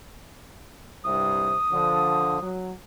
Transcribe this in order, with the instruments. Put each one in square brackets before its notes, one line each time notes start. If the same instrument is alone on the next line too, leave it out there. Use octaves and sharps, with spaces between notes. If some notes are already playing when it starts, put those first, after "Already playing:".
[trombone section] C2 G2 C3 [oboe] D#6
[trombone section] D3 F3
F#3